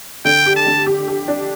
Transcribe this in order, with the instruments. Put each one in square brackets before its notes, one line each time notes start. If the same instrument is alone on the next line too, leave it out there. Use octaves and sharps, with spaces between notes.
[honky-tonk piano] D3 [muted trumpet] G5
[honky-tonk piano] G4
[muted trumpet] A5
[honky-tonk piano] D3
G4
G4
D4